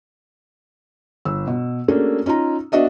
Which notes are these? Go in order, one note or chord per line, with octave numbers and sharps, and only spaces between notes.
G1 E6
B2
A3 A#3 C#4 D4 F#4 G#4
C#4 D#4 F4 A#5
B3 D4 F#4 D#5 E5